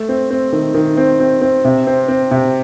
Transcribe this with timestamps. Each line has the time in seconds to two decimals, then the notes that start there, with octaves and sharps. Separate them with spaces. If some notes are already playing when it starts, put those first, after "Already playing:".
Already playing: A3
0.09 C4
0.30 C4
0.53 D#3
0.74 D#3
0.97 C4
1.20 C4
1.42 C4
1.65 C3
1.87 C4
2.08 C4
2.31 C3